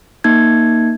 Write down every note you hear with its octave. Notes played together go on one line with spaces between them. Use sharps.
A#3 D#4 G#6